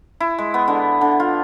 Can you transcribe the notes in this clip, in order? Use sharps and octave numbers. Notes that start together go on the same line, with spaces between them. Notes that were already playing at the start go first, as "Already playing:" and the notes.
E4
G#3
B3
D3
D3
F4